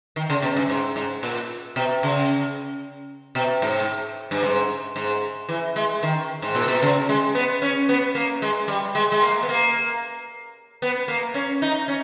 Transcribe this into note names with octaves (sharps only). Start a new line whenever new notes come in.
D#3
C#3
B2
G2
G#2
G#2
A#2
B2
C#3
B2
G#2
G2
G#2
G#2
E3
G#3
D#3
G#2
A#2
B2
C#3
G#3
B3
C#4
B3
A#3
G#3
G3
G#3
G#3
A#3
B3
A#3
B3
A#3
C#4
D#4
C#4